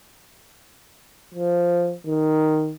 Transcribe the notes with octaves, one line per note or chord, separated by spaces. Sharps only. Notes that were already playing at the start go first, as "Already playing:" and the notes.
F3
D#3